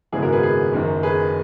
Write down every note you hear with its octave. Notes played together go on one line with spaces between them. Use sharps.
G#1 F#2 C#3 G#3 B3 E4 G#4
F#4 A#4
G#4 B4
G#4 B4
F#1 F#2 D#3
G#4 B4